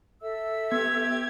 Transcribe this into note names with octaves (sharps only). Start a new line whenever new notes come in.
A4 E5 E6
B3 G4 G#6